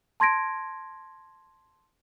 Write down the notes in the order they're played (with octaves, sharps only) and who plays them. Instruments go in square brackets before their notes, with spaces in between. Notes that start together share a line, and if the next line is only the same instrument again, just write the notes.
[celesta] A5 C6 G#6 A#6 D7